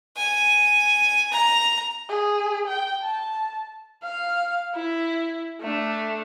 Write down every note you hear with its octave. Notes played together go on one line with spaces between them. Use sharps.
G#5
A#5
G#4
G5
A5
F5
E4
A3 D4